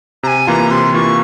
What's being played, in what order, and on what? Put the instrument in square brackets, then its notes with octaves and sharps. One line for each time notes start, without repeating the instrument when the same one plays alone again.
[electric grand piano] C3 [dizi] A#5
[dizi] G#5
[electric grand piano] E3 A#3 F4 [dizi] A#5
[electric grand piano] C3 [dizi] C6
[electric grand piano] E3 A#3 F4 [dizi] C#6